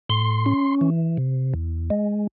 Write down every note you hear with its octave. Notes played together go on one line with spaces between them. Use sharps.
A2 C6
C#4
E3
C3
E2
G#3